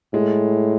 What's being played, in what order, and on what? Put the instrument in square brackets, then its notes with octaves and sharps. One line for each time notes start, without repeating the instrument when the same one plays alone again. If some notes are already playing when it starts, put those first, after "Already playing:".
[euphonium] A2 [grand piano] G#3